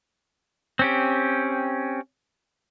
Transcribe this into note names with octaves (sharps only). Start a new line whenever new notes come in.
C4 C#4 G4